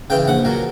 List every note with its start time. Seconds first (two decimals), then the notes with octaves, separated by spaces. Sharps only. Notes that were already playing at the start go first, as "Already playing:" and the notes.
0.10 C#3 E3 G5
0.28 A#1 F#5
0.45 A#2 F#3